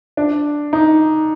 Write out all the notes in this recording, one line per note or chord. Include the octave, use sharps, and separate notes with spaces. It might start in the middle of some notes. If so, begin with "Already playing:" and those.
D4
D#4